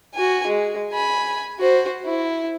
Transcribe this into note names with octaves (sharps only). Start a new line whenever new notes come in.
F#4 G#5
G#3
G#5 B5
F#4 C5
E4